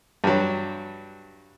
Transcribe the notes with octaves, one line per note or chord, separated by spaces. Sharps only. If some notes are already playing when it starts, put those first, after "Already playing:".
G2 F#3